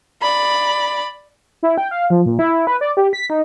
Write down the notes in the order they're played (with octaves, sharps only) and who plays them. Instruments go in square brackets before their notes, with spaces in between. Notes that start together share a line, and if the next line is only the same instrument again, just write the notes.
[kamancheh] D5 B5
[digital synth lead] E4
G5
F5
F3
A#2
E4
B4
D5
G4
B6
D#4